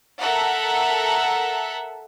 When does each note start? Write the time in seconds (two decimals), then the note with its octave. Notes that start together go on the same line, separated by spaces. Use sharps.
0.19 A4 A#4 E5 F#5